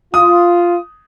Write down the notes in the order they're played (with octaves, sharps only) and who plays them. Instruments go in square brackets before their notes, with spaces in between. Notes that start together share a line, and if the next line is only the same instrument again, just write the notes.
[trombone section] F4 [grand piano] D#6